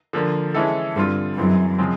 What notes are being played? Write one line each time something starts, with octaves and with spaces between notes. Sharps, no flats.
D3 F3 A#3
E3 G#3 C#4 E4 A4
G2 D3 G3 C4 F4
F#2 E3 G#3 C4
C#3 F3 G#3 C4